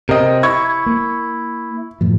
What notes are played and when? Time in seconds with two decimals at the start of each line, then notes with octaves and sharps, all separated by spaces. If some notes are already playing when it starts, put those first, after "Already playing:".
0.09 C3 C4 A#4 D#5
0.43 E4 C#6 G#6
0.86 A#3
2.01 F#2 A2 F3